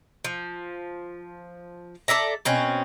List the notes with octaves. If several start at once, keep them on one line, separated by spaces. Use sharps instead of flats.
F3
A4 D5 E5 A#5
B2 C4 C#4